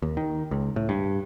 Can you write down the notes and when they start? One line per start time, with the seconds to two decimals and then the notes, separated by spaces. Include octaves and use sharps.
0.02 D#2
0.17 D#3
0.51 C#2
0.76 A2
0.89 G2